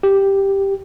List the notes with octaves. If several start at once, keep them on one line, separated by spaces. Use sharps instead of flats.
G4